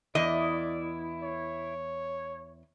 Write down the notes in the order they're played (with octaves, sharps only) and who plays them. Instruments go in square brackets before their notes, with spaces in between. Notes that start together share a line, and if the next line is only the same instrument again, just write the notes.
[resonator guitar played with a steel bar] E2 D#5 [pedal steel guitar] E4 [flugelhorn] D5
[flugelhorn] C#5